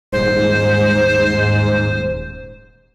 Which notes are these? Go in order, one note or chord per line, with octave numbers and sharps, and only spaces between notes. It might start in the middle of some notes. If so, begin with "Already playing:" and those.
D#1 G#2 C5